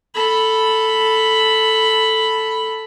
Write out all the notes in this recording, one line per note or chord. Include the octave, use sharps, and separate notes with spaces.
A4 B5